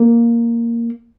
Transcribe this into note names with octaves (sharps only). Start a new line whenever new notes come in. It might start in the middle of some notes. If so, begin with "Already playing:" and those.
Already playing: A#3